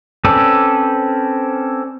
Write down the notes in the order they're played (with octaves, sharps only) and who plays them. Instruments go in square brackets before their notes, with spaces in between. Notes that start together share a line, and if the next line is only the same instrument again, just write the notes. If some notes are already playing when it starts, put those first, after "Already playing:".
[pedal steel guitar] C4 C#4 A4 B4 D5